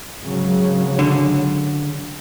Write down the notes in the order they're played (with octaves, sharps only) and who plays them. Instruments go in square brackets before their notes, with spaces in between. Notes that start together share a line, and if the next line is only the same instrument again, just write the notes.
[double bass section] G#1 C#3 F#3
[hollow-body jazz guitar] D3